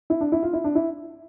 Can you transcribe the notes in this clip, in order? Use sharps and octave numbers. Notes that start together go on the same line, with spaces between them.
E4
D4
E4
F4
E4
D4
E4